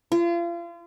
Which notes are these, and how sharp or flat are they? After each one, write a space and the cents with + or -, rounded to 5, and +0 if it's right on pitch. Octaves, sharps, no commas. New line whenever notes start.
F4 -35